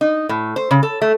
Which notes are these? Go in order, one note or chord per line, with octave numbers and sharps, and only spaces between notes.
D#4
A2
C5
C#3
A4
A3